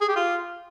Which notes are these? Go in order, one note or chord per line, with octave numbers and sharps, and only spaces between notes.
G#4
G4
F4